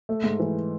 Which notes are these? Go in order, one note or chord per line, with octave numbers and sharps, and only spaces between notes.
A3
G#2
E3